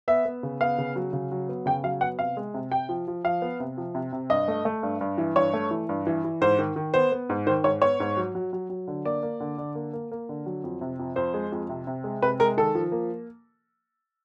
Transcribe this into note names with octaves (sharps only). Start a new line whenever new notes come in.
B3 E5
B3
C#3
B3 F5
C#3
F#3
C#3
F#3
B3
C#3 G5
F#3 F5
B3 F#5
C3 F5
G#3
C3
C3 G5
F3
F3
F3 F5
B3
C3
F3
C3
C3
G2 D#5
A3
A3
G2
G2
E3
G2 C#5
A3
E3
G2
E3
E3
G#2 C5
D#3
D#3
B3 C5
B3
G#2
D#3 C5
G#2 C#5
B3 C#5
G#2
F#3
F#3
F#3
F#3
D3
A#3 D5
A#3
D3
D3
A#3
A#3
A#3
D3
F#3
F2
C3
F2
F2 C5
G#3
F2
C3
C3
G#3
C3 B4
G#3 A#4
D#3 A4
F3
A#3